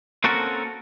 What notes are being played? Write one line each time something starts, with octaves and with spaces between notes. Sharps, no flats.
A#3 C4 C#4 F#4 A4 A#4